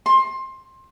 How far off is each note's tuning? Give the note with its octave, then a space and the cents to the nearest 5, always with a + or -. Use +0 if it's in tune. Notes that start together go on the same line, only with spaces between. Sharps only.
C6 +20